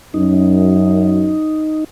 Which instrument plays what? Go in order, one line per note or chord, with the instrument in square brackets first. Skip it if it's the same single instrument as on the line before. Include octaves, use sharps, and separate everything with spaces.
[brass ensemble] F#2 [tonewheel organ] D#4